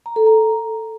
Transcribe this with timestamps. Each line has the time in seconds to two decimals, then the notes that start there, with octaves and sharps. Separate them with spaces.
0.06 A#5
0.16 A4
0.27 A#5